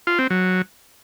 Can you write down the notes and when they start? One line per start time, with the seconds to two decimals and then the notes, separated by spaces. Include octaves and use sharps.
0.07 F4
0.19 C4
0.30 F#3